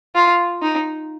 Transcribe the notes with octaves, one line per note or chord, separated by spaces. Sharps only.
F4
D#4